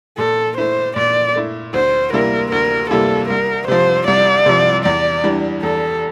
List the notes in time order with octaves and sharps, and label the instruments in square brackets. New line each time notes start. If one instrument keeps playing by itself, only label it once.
[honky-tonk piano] A#2 [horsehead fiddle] A4
[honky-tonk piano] A3 E4 [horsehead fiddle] C5
[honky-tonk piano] A#2 [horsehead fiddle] D5
[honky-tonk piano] A3 E4
[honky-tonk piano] D2 [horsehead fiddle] C5
[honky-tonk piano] C3 G3 A#3 E4 [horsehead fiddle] A#4
[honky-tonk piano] D2 [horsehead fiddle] A#4
[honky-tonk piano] C3 G3 A#3 E4 [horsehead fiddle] A4
[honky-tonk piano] C2 [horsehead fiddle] A#4
[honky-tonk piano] C3 F3 [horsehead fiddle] C5
[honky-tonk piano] C2 [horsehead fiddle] D5
[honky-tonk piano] C3 F3
[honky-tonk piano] E2 [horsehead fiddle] D5
[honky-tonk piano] E3 G3 D4
[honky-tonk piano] E2 [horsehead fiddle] A4